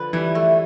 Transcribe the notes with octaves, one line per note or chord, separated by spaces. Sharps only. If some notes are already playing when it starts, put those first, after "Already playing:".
Already playing: D3 F3 B4
E3 G3 E4
A3